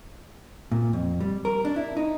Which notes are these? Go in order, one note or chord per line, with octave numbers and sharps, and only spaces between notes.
A#2
F2
G3
A#4
D4
E4
D#4